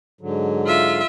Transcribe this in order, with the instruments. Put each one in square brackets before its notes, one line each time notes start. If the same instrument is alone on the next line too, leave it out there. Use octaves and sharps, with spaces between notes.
[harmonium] G#2 D3 F#3
[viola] F4 E5